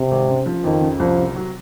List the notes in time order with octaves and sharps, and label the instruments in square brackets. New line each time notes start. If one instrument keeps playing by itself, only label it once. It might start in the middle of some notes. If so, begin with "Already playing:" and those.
Already playing: [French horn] C3
[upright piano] G#1
C#3
F3
[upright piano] F2 [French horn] D#3
[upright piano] C#3
[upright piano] C2 [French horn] F3
[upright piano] C3
F#3